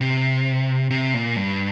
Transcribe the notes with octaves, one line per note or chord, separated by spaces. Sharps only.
C3
C3
A#2
G2